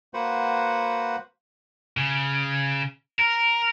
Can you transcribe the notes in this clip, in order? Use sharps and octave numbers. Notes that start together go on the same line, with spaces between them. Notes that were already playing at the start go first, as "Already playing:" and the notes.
A#3 F#4 B4 C5 F#5
C#3
A#4